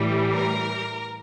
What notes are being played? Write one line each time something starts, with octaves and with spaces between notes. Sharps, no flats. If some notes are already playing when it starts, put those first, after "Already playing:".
Already playing: A2 E3 G3
A#4